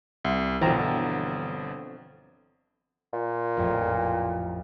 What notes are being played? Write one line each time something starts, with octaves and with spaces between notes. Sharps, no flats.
C2
G1 B2 D3 E3 F3 C4 A#5
A#2
A1 F2